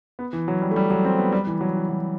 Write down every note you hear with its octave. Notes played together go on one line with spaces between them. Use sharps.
B3
E3
F#3
G3
A3
G3
F#3
C4
B3
G3
E3
F#3
E3
F#3